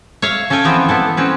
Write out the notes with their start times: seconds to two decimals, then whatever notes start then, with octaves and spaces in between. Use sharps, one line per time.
0.22 C#5 E5 F5
0.50 C#4 A4 F5 G5 G#5
0.65 E3 F3 B3 C4
0.89 B3 E4 A4
1.17 C4 C#4 B4